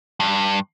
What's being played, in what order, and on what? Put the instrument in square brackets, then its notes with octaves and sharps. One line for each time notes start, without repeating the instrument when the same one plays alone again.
[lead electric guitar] G2